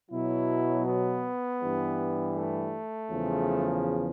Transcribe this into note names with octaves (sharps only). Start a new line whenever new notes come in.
B2 F#3 E4
B3
G2 E3 G3
A3
E2 C#3 F3